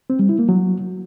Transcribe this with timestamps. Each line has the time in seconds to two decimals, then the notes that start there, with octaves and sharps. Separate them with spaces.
0.10 C4
0.19 G3
0.29 E4
0.39 A#3
0.49 F#3